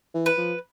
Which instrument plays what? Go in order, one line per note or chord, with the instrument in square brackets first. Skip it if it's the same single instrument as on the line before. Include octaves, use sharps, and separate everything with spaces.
[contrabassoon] E3
[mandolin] B4
[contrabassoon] F3